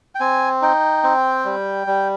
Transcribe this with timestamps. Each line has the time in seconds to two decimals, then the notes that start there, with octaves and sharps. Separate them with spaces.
0.15 G5
0.20 C4 G#5
0.62 D#4 G5
1.04 C4
1.45 G3
1.87 G3